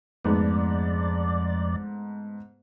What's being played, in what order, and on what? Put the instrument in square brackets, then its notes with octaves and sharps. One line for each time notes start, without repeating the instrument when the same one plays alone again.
[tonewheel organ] F2 D5 [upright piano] G#2 A3 B3